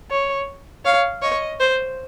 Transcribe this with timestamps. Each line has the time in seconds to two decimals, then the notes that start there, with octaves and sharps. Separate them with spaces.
0.11 C#5
0.85 C#5 F5
1.22 C#5 D#5
1.60 C5